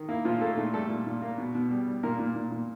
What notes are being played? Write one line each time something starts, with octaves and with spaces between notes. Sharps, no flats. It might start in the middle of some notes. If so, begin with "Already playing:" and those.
Already playing: D#3
A#3 E4
A#2 F3 F4
A3 A#3 A4
A#2 A3 A4
G3 A3 A4
A#2
A#2
A#3
B2
B2
G3
G3
A#2 A#3 A#4
A#2
A#2
A#2